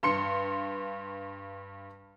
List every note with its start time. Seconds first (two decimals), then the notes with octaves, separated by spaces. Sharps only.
0.03 G2 C6 C#7